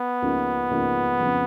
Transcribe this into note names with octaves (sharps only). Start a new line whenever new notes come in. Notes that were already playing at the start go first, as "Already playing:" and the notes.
Already playing: B3
C#2 C#3 F3 A#3 D#4
C#2 C#3 F3 A#3 D#4
F2 C#3 F3